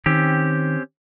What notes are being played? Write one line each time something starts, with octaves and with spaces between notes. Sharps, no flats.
D#3 C4 C#4 G4